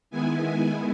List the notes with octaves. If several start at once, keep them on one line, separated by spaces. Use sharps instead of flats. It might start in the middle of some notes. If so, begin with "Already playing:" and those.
D#3 G#3 B3 E4 G#5
G#5